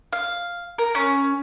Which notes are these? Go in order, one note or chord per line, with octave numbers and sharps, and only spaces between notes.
F5
A#4
C#4